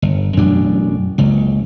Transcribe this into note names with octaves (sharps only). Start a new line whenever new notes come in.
G1
A1 F#2 B2 D4
F#1 C#2